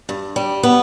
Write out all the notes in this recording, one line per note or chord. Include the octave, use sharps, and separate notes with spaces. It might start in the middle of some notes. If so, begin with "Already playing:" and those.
G2
G3
B3